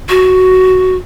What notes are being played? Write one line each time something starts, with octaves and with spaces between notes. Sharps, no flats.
F#4